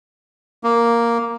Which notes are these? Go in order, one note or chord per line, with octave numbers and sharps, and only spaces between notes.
A#3